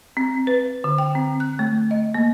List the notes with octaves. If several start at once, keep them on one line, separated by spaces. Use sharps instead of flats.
C4
B4
D3
G5
C4
F#6
A3
D#5
A#3